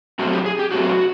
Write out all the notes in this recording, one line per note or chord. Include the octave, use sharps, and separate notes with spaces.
B2 F#3 A3 C4 F#4
G4
G#4
G4
B2 F#3 A3 C4 F#4